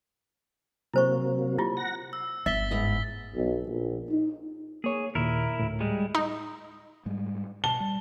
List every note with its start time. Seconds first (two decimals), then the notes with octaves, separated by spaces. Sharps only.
0.94 C3 F#3 A#3 E4 C5 C#6
1.59 E4 F4 G4
1.77 F#5 A#6
2.13 E6
2.46 G1 E5 A6 B6 G7
2.71 G#2 B4 D#5
3.35 B1
3.65 A#1
4.10 D#4
4.84 A#3 G#4 C#5
5.15 D#2 A#2 E4 A#4
5.59 D2 A2
5.80 G3 G#3
6.15 D#4
7.06 G#2 G3 G#3
7.64 B2 A5 G7
7.80 G3